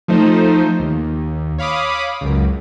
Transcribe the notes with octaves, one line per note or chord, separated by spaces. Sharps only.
F3 A3 D#4 C5
D#2
C#5 F5 B5 D6 D#6
C#2 F#2